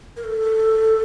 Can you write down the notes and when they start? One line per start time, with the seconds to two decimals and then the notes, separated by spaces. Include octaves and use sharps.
0.17 A#4
0.24 A4